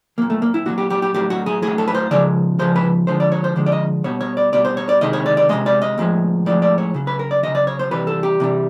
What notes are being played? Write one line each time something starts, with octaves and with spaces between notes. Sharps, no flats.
A#2 F#3 A#3
A3
A#3
E4
A#2 F#3 F#4
G4
G4
G4
A2 F#3 G4
F#4
G#4
A2 F#3 G#4
A4
B4
C5
C#3 F3 G#3 D5
C#3 F3 G#3 C5
B4
D3 F3 G#3 C5
D5
C#5
C5
D3 F3 G#3
D5
D#5
B2 G3 C#5
C#5
D5
B2 G3 D5
C5
C#5
D5
C3 D#3 G#3 D#5
C#5
D5
D5
C3 D#3 G#3 D#5
D5
D#5
A2 F3 G#3
A2 F3 G#3 D5
D5
C#5
C#3 F#3
B4
A#4
D5
C#3 F#3 D#5
D5
C#5
C5
C3 E3 G3 B4
A4
G4
C3 E3 G3